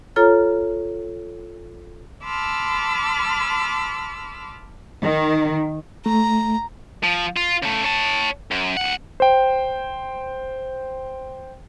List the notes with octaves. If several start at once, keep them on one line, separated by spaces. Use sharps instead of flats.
F4 A4 C#5 A#5 F6
A5 B5 C6 D6 E6 F6
D#3
A3 A#5
F3
F4
C#3 A3
C#5 A5
F#2
C#2 F#5
C5 G5